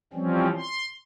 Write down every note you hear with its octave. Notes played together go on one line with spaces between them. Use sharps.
E3 F3 G3 C4 C#4
C6